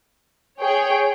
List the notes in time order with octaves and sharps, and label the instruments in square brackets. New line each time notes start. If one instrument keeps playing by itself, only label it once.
[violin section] G#4 C#5 G5